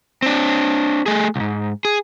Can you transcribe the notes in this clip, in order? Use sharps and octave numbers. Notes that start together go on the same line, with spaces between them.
C4 D4
A3 G#4
C2 G#2
G#4